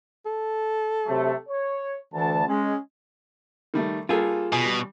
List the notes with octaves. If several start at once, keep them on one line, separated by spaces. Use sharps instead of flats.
A4
C3 F#3 A3
C#5
D2 E3 A5
G#3 C#4
D#3 G3 A3
G3 A#3 F4 G#4 A4
B2 G#5
G3